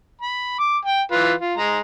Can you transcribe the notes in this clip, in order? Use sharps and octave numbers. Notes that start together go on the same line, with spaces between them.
B5
D6
G5
E3 F4 B4
F4
G#3 A#5